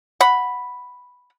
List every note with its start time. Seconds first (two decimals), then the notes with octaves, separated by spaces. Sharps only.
0.21 F#5 B5